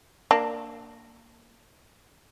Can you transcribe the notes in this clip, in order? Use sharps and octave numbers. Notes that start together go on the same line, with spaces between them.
A#3 D4